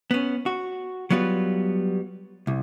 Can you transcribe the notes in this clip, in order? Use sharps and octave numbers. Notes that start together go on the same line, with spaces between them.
B3 C#4
F#4
F#3 G3 B3 F4 B4
C2